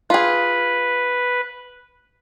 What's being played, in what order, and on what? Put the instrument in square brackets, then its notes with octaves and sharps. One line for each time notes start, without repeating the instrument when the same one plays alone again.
[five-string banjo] F4 G#4 [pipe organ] B4